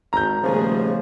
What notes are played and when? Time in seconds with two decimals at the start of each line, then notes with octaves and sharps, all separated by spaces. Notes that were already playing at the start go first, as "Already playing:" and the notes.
0.13 G#1 A#5 G6
0.43 D#1 C#3 F3 A3 B3 G#4